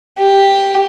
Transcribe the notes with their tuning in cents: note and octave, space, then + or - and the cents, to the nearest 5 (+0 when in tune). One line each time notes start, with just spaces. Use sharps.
G4 +5